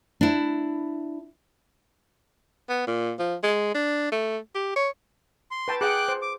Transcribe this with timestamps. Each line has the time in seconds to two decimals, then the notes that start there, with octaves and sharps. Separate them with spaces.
0.21 D4 E4
2.69 B3
2.87 A#2
3.19 F3
3.43 G#3
3.75 D4
4.12 A3
4.55 G4
4.76 C#5
5.51 C6
5.68 B4 G5 A5
5.81 G#4 F#5 G5 D6 F#6
6.08 C5
6.22 D6